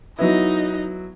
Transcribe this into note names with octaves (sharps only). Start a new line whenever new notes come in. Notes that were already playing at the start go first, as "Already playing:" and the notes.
F#3 B3 D#4 E4 D#5